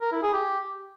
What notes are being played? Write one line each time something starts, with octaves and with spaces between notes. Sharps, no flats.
A#4
E4
G#4
G4